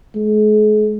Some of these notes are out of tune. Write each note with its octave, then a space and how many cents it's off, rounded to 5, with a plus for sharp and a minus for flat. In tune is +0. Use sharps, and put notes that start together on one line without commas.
G#3 +45